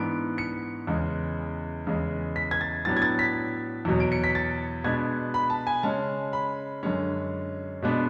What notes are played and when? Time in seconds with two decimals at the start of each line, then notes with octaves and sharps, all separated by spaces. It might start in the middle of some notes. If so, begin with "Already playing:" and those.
Already playing: G#2 E3 B3 D4 D7
0.38 C#7
0.87 E2 C#3 G#3
1.87 E2 C#3 G#3
2.36 B6
2.51 G#6
2.61 A6
2.85 A2 F#3 B3 D4 A6
2.97 G#6
3.02 A6
3.19 B6
3.85 E2 B2 F#3
4.00 D7
4.12 C#7
4.24 B6
4.35 A6
4.84 B2 G#3 B3 D4 G#6
5.34 B5
5.50 A5
5.67 G#5
5.83 C#3 G#3 C#4 A5
6.33 B5
6.83 F#2 D3 G#3 C#4
7.82 B2 G#3 B3 D4